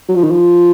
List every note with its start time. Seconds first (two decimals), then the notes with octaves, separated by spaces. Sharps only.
0.09 F#3
0.16 F3
0.23 D#3
0.31 F3